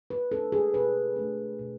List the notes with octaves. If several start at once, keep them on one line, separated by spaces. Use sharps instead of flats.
B4
A3 D4 A4
G#4
B2 B4
A3 D4
B2